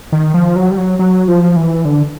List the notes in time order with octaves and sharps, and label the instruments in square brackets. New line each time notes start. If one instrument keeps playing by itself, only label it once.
[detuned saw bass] D#3
F3
F#3
G3
F#3
F#3
F3
E3
D3